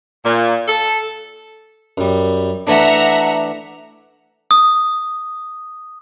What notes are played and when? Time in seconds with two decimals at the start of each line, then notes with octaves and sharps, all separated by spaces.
0.25 A#2
0.67 A4
1.98 F#2 G3
2.67 E3 A3 D4 E5 F#5 A#5
4.51 D#6